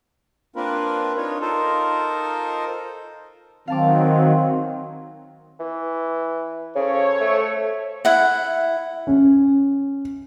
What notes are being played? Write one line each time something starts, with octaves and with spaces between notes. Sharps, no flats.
A#3 C4 D4 F4 A#4 B4
D4 D#4 F4 C#5
D#4 F4 A4 A#4 C5
D#3 F#3 C4 F5 A5 D6
E3
C#3 A4 C5 C#5
A3
E4 F#5
C#4